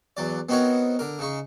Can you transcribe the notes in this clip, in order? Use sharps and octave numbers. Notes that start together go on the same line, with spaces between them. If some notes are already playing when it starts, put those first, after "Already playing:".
E2 F#3 D5
B3 C4 D#4 F#4 A#4 C#5
D3 A#4
C#3 D#4 C#6